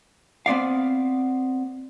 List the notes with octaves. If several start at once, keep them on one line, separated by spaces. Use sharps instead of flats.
B3 C4 D5 F5